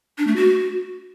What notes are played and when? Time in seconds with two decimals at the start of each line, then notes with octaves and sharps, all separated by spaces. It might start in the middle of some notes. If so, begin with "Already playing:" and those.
0.18 D4
0.27 A3
0.36 F#4